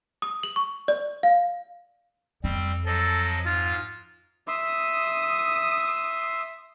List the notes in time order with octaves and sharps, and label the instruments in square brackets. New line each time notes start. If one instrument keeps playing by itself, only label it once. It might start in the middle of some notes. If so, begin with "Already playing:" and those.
[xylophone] D#6
F#7
C#6
D5
F5
[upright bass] F2 [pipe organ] G3 C4
[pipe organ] F3 F#3 D#5 [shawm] A4
[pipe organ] G#2 [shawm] F4
[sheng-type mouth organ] E5 C6 [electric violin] D#6